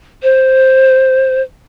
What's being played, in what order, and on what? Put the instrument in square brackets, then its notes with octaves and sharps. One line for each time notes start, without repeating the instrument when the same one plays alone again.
[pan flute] C5